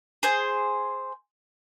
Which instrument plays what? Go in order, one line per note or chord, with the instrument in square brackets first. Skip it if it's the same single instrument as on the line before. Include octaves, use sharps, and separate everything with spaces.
[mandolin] G#4 C5